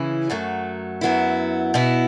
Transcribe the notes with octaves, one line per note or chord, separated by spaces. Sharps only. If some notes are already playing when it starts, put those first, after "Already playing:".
Already playing: C#3 E3 C#4 E4
F#2 F#3 A3
F#2 F#3 B3 E4
B2 B3 E4